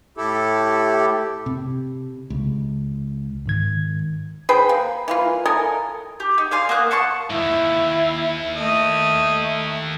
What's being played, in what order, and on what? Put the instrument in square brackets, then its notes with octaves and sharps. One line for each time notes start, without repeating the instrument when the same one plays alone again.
[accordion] A2 E4 G4 A4
[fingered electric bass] C3
C#2
[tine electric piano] G#2 D#3 G#6
[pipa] G#4 B4 C5 G5
A#3
E3 A#3 F4
A4 A#4 D#5 G#5
[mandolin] G4
D#4
D5 F5 G#5 C6
A#3 B3 D#5 F#6
F#5 A5 C6 C#6
[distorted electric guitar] D#2 G#2 [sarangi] E4
[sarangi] A3 [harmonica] D#5